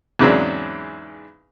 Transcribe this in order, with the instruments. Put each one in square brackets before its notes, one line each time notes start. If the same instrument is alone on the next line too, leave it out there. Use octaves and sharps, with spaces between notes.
[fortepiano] E2 G#2 C#3 F#3 C4 D4